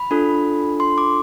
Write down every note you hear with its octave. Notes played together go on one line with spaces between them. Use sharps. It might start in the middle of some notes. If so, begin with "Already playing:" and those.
Already playing: B5
D4 F4 A4
C6
D6